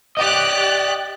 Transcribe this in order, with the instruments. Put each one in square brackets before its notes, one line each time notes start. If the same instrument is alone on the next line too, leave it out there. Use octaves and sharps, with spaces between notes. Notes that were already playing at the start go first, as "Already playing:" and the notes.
[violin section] G4 F#6 [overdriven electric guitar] D5 D#5